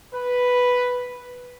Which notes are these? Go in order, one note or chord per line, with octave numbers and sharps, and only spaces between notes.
B4